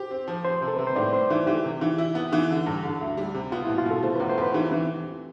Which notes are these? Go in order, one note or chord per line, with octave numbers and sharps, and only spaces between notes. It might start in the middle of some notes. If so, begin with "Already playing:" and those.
Already playing: G4 C5
C4
F3
F3 C5
C3
A4
C3 B4
C5
A2 D5
C4 C5
E3 A4
E3 G4
C3
E3
E4
B3
E3
D3
G2
D3
D2
G3
C3
B3 F4
B2 E4
F4
B2 A4
A3 C5
E2 B4
C5
E2 B4
E3 G4
E3 C4